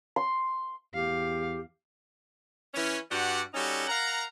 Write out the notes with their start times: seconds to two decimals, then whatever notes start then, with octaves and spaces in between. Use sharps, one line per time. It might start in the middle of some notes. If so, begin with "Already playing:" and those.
0.16 C6
0.94 E2 G4 F5
2.74 E3 C#4
3.09 G2 F#4 G4 D5 F#5
3.54 G3 C#4 D#4 F#4 A4
3.87 A#4 F5 F#5 A#5